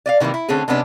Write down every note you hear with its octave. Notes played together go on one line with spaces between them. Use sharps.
D5 D#5 F5
C3 D#3 E3 G3 A#3
E4
D3 A3 C4 C#4 G#4
C3 G#3 B3 C#4 D4